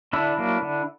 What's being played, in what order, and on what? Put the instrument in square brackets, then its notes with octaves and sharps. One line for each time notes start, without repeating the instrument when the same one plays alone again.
[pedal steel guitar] D3 D4 E4
F#3 A#3
D3